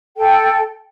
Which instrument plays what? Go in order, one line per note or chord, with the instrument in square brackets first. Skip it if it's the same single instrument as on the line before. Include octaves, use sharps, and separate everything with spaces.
[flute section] A4 G5